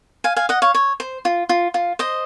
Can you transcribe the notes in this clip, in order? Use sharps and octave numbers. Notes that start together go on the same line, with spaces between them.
F5 G#5
F5 G#5
D#5 F#5
C#5 F5
C#5
C5
F4
F4
F4
C5 D#5